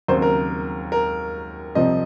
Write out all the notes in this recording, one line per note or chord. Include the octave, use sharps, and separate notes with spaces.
D#2 C#3 F#3 C4 C5
A#4
A#4
C2 C3 F3 C4 D#5